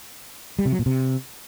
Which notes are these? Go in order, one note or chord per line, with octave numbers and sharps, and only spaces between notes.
G3
C3
F#3
A#2
C3